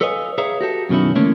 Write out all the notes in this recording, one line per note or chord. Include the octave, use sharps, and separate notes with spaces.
A4 B4 C#5 D#5 F5 G#5
G#4 B4 C#5 E5 F5 A#5
F#4 G4 A4
F#2 B2 D#3 C#4 E4
D3 E3 A3 A#3 C#4 D4